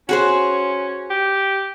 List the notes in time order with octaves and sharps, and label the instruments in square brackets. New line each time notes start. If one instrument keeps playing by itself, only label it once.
[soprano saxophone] C#4 [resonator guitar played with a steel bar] F#4 G#4 C5
[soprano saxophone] G4